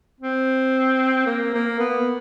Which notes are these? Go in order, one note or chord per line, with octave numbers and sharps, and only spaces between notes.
C4
A#3
A#3
B3